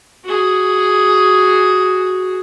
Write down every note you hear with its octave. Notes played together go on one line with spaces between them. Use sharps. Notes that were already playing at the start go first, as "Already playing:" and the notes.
F#4 G#4